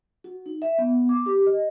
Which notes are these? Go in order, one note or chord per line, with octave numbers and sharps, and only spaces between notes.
F#4
D#4
E5
B3
D6
G4
D#5